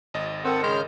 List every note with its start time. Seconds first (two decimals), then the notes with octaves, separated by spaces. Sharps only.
0.14 G#1 D#5 A6
0.45 C4 A4 A#4 F#5 G5
0.63 C#3 G#3 F6 G6